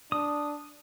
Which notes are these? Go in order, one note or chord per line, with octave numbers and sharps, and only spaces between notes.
D4 D#6